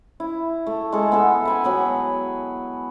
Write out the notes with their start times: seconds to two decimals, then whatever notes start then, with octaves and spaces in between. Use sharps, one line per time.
0.20 E4
0.66 A3
0.92 G#3 A4
1.12 B3 A4 E5
1.45 G5 G#5 B5
1.64 F#3 B3 B5